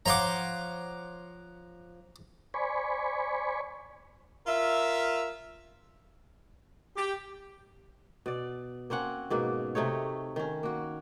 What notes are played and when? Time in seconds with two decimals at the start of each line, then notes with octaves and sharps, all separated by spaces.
0.06 F3 C5 C#5 F5 F#5 A#5 C6 D6
2.54 C5 D5 G#5 B5 C#6
4.47 F4 A#4 E5
6.96 G4
8.26 B2 D5
8.90 A#3 C4 C#4 F#5
9.30 G#2 B2 A#3
9.75 C3 A3 D#4 C#5
10.36 D#3 C#4
10.63 A#3 F#4